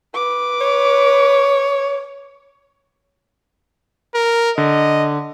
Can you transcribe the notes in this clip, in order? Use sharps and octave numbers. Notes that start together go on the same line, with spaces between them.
B4 D6
C#5
A#4
D3 D#5